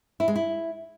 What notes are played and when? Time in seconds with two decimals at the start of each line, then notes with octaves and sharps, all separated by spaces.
0.20 E4
0.28 G#3
0.36 E4